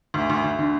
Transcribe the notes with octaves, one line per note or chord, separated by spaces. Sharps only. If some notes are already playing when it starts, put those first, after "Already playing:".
D2
D2
D2
D3